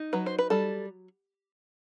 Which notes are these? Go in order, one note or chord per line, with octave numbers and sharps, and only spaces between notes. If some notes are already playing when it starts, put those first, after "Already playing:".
Already playing: D#4
F#3 B4
C5
B4
G3 A4